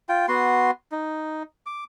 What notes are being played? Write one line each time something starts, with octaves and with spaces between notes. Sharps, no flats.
F4 G5
B3 F#4 C6
D#4
D6